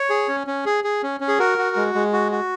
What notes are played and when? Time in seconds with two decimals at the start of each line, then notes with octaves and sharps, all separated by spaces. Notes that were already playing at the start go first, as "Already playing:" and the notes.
Already playing: C#5
0.10 G#4
0.28 C#4
0.47 C#4
0.66 G#4
0.84 G#4
1.03 C#4
1.20 C#4
1.28 G#4
1.39 F#4 A#4
1.58 F#4
1.76 G#3
1.95 G#3
2.13 F#4
2.32 F#4